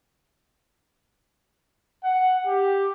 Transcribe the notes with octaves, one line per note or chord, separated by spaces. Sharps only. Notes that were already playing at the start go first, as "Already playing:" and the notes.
F#5
G4